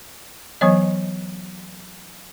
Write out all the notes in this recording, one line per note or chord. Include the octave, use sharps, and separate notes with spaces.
E3 F#3 B3 C#5 D#5